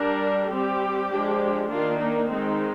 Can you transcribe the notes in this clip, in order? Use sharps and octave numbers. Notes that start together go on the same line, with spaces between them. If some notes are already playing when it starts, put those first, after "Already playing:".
Already playing: G3 D4 A#4
G3 C4 G4
F3 G#3 D4
D#3 A#3 D4 F4
D#4
D#3 G#3 C4 D#4